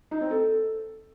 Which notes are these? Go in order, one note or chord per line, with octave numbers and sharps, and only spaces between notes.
D#4
C4
A4